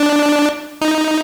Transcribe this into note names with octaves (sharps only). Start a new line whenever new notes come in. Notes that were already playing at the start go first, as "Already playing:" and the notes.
Already playing: D4
D#4